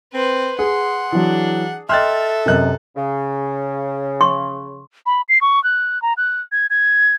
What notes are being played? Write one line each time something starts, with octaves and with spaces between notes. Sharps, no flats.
C4 B4 C5
G#4 F#5 C6
E3 F#3 D4
A4 D#5 E5 G5 C6 F6 F#6 A6
F#2 C3 A#4 D#5 F#6
C#3
C6 C#6
B5
C7
C#6
F#6
A#5
F#6
G#6
G#6